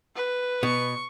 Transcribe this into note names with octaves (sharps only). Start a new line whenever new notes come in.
B4
B2 C#6